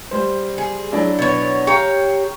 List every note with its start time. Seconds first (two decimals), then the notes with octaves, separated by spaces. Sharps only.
0.11 G3 C5
0.58 G#4
0.92 F#3 D4 E4
1.19 B2 C#5
1.67 G4 C#5 F5 G5 A#5 C#6